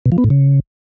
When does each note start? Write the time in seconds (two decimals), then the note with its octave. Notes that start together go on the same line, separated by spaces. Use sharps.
0.06 B2
0.12 F3
0.18 B3
0.24 A2
0.30 C#3